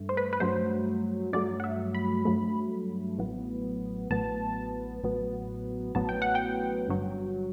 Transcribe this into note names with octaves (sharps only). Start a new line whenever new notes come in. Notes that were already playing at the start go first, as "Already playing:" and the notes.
Already playing: G2 A3
C5
B4
B4
G2 F#3 A3 C5
G2 F#3 A3 D5
F#5
E5
B5
G2 F#3 A3
A1 A2 F#3 B3
A1 A2 F#3 B3 A5
A1 A2 F#3 B3
A1 A2 F#3 B3 A5
G5
F#5
G5
G1 G2 F#3